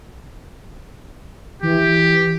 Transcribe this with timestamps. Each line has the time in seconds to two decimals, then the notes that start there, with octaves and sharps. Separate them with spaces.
1.63 E3 G4